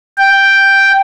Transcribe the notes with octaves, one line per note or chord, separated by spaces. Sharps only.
G5